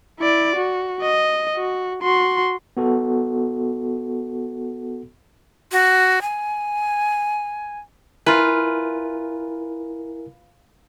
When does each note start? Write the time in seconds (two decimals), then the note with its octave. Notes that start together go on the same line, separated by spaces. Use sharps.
0.20 E4 D5
0.56 F#4
1.02 D#5
1.56 F#4
2.03 F#4 C6
2.77 B3 F#4 A4
5.72 F#4
6.22 G#5
8.26 E4 F4 A#4 B4 G#5